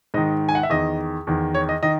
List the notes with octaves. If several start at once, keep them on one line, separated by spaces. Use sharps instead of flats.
G#2 D#3 D#5
G#5
F#5
E5
E2 D#3 D#5
E2 D#3
C#5
D#5
D#3 D#5